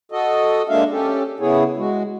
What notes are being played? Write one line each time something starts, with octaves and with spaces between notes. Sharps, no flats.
F#4 A4 D#5
G#3 A#3 D4 E5 F5
C#4 G4 A4
C#3 B3 E4 G#4 C#5
G#3 F#4